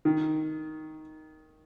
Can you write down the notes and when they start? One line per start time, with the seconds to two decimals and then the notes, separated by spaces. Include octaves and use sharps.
0.05 D#3